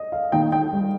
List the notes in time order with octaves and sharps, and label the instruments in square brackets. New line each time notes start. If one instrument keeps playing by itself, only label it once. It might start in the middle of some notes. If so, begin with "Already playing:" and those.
Already playing: [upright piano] D#5
F5
[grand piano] D#3 A#3 D#4 [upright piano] G5
[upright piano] G5
[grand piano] G3